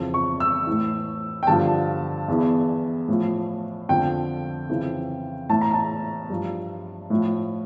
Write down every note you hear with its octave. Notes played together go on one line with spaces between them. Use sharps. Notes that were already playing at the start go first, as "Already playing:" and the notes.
Already playing: F2 C#3 E3
C#6
E6
A2 E3
G5
G2 D3 F3 A5
E2 E3
A2 F3
F2 D3 F3 G5
F2 C#3 E3
A2 E3 A5
A#5
A5
G2 F3
A2 F3